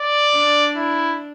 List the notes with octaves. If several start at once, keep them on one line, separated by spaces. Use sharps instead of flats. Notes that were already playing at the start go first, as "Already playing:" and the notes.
Already playing: D5
D4
E4